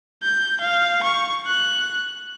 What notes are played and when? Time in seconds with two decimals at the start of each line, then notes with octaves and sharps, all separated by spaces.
0.23 G6
0.61 F5
1.03 C#6
1.47 F#6